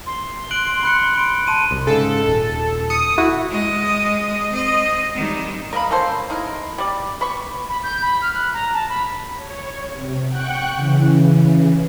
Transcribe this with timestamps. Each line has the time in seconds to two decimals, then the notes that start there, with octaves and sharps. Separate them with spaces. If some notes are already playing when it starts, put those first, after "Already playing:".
0.07 C6
0.51 F#6 D7 F#7
0.83 B5 F#6 C#7
1.17 D7
1.47 A5 C6 D#7
1.71 C2
1.87 G#2 C#3 A4
2.27 D#1
2.90 D#6 C#7
3.18 E4 F#4
3.48 G#3 D#5
4.50 C4 D#5
5.14 D#3 G3
5.73 A#4 D#5 F5 B5
5.91 A#3 C#4 A4 C5
6.30 D#4 E4 A#4
6.78 G3 D5
7.21 B4 B5 C#6
7.69 B5
7.83 G6
8.02 B5
8.22 F6
8.34 F#6
8.53 A#5
8.73 A5
8.89 B5
9.35 C#5
9.90 C3
10.26 F#5 G5 C#6 F#6
10.75 C#3 E3